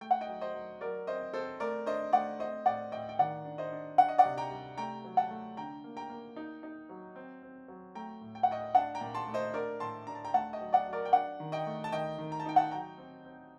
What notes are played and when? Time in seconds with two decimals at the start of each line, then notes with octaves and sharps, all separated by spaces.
0.01 A3 G5
0.11 F#5
0.21 D#5 G5
0.28 F#3
0.41 C5 D#5
0.54 F#3
0.81 F#3 A#4 D5
1.07 C4 C5 D#5
1.34 C4 A4 C5
1.60 A3 A#4 D5
1.86 D4 C5 D#5
2.13 A3 D5 F#5
2.39 C4 C5 D#5
2.66 A2 D5 F#5
2.92 A2 D#5 G5
3.09 G5
3.19 D#3 D5 F#5
3.45 D4
3.58 C5 D#5
3.72 D4
3.98 D4 F#5
4.08 D#5
4.18 D5 F#5
4.25 C3
4.37 G5 A#5
4.51 G3
4.78 A3 G5 A#5
5.05 F#3
5.17 F#5 A5
5.30 A3
5.57 D3 G5 A#5
5.84 A#3
5.97 G5 A#5
6.10 A#3
6.36 D#4
6.63 D#4
6.89 F#3
7.16 C4
7.43 C4
7.68 F#3
7.95 A3 G5 A#5
8.21 A2
8.35 G5
8.43 F#5
8.48 A2 D#5 G5
8.75 D4 F#5 A5
8.95 G5 A#5
9.01 A#2
9.14 A5 C6
9.28 A3
9.34 C5 D#5
9.54 D4 A#4 D5
9.80 A2 A5 C6
10.07 D4 A#5
10.15 A5
10.25 G5 A#5
10.34 A3 F#5 A5
10.53 D#5 G5
10.61 F#3
10.73 D5 F#5
10.87 F#3
10.93 A#4 D5
11.05 G5
11.12 D4 D5 F#5
11.40 D#3
11.52 D#5 G5
11.66 A3
11.84 A5
11.92 D#3 D#5 G5
12.18 D#3
12.32 A#5
12.40 A5
12.46 D#4 G5
12.56 F#5 A5
12.71 F#3 G5 A#5
12.98 C4
13.25 C4